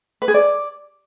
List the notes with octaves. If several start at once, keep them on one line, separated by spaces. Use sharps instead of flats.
B4
G#4
D5